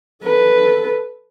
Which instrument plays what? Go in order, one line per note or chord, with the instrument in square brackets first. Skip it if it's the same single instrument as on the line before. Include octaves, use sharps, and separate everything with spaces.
[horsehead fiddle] A4 B4